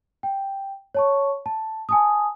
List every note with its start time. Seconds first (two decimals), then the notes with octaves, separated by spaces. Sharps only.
0.23 G5
0.94 C#5 A5 C#6
1.46 A5
1.89 G#5 A5 D#6